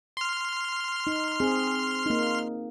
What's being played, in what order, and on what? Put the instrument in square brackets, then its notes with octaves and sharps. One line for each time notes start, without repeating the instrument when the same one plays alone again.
[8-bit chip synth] C6 F6
[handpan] D#4
C4 G#4
A#3 D#4